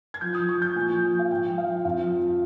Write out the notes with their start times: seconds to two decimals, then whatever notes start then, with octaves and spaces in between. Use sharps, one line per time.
0.14 G#6
0.21 F3 G6
0.35 F3 D#6
0.49 C#6
0.57 F3 G6
0.76 A#2 G#5
0.94 F3
1.12 F3
1.19 F5
1.30 G#2 G5
1.49 F3
1.58 F5
1.66 F3
1.85 F2 F5
2.03 F3
2.22 F3